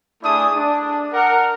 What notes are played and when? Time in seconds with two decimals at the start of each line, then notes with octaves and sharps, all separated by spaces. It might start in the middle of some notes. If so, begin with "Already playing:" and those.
0.22 A3 D4 E4 G#4 D#6
0.54 D4
1.12 A#4 F#5